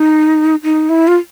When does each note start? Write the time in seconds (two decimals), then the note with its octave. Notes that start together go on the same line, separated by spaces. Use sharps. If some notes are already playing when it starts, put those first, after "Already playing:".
Already playing: D#4
0.63 D#4
0.89 E4
1.08 F4